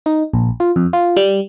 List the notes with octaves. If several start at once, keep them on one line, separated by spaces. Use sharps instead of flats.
D#4
A#1
F4
F2
F4
G3